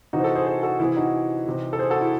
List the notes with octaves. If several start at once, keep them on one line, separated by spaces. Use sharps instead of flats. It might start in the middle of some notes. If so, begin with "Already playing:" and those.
C3 E3 D#4 F#4
C5
F#4 A4
G#4 C5
G#4 C5
F#4 A4
C3 E3 E4 G#4
D#4 F#4
C3 E3
A4
G#4 C5
F#4 A4
E4 G#4